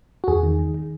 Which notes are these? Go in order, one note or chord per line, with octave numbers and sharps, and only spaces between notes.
F#4
E2 G#4
D#3
D#3
D#3